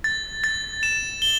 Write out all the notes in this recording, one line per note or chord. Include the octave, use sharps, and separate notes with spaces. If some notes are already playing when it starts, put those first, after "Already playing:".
A6
A6
E7
G7